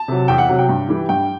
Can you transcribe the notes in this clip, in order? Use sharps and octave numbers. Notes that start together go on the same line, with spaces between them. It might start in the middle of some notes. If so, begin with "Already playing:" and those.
Already playing: A5
C3 F#3
E2 G5
F#5
C3 F#3
G5
G2
E3 G3
G2 G5